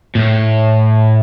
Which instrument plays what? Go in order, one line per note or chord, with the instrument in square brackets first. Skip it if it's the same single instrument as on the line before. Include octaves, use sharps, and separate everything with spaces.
[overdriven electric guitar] A2